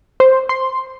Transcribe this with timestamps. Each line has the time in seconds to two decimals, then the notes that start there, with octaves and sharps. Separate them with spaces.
0.20 C5
0.49 C6